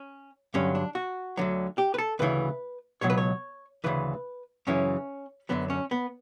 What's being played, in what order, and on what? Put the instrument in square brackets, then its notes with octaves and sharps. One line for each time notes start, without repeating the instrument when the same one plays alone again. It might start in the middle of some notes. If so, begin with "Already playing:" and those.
Already playing: [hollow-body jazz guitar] C#4
G2 D3 F#3 C#4
D4
F#4
D2 D3 F#3
G4
B4
A4
D2 C#3 E3 B4
C#2 B2 F#3 C#5
B4
C#5
D2 C#3 E3 B4
F#2 C#3 E3 C#4
F#2 D3 F#3 B3
C#4
B3